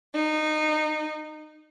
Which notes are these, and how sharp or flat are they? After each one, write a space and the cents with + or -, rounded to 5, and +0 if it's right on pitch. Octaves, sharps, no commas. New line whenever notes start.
D#4 -20